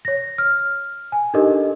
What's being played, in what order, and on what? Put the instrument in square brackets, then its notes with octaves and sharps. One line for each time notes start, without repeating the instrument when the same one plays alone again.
[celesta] C#5 A#6
F6
G#5
D4 D#4 G4 A4 A#4 D#5